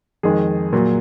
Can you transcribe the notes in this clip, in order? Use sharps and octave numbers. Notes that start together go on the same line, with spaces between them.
F2 D#3 G#3 G#4
A#2 F#3